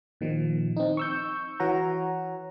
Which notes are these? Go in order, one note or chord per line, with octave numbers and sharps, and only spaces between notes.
A#2 D#3 F3
C4 D#4
C#6 E6 G6
E3 F#4 C#5 F#5 A#5